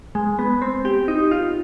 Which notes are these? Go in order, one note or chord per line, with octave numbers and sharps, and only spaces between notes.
G#3
B3
C4
G4
D#4
F4